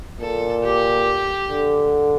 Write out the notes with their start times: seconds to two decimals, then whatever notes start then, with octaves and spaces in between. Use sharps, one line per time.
0.20 A#2 A4
0.64 G4
1.50 D3